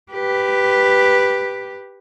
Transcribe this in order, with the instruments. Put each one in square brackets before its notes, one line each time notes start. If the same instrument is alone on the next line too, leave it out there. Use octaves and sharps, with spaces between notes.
[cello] G4 B4